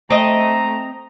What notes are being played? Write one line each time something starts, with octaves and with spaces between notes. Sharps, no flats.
A3 C4 D#5 A#5